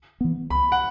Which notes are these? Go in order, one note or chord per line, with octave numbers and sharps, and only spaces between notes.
E3 B3
C#2 B5
F#5